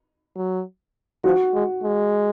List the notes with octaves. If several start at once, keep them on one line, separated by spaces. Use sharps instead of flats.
F#3
F3 F#4
G#3
G#3